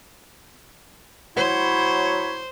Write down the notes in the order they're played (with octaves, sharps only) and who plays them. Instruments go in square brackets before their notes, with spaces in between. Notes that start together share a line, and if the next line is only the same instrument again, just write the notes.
[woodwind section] F#3 E4 C#5 [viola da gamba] C5